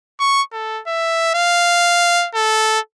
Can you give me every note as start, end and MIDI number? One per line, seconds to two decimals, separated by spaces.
0.20 0.42 85
0.52 0.82 69
0.87 1.33 76
1.35 2.28 77
2.34 2.80 69